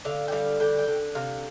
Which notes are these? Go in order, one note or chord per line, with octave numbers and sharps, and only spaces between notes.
D3 F5
G5
G3 F5
D3 G5
G5
D3
C3 F5